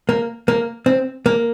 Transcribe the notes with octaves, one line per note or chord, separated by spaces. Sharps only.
A#3
A#3
C4
A#3